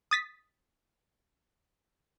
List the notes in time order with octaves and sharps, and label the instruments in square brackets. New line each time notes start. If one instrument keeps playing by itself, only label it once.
[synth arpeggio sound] D#6 A6 B6